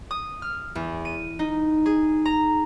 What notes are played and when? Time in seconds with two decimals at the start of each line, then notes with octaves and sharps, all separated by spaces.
0.11 D#6
0.42 F6
0.75 E2
1.05 D#7
1.39 D#4
1.86 G#4
2.25 A#5